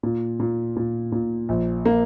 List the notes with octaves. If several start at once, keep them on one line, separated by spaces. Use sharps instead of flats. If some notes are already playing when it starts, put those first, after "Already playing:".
A#2
A#2
A#2
A#2
A#1
A#3